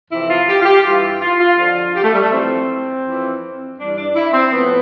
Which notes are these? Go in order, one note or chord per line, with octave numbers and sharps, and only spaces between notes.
F2 C3 E3 E4
F4
G4
F4
G4
G2 E3 F4
F4
F4
F2 D3 F3 F4
G4
A3
G3
A3
F2 E3 C4
F2 E3
G2 E3 D4
D4
E4
C4
A2 F3 B3